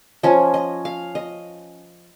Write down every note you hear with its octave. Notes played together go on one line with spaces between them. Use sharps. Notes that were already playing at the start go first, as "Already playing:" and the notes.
F3 C#4 D#5
D#5
F5
D#5